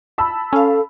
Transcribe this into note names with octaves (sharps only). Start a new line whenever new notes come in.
A5 B5 E6
C#4 A4 F5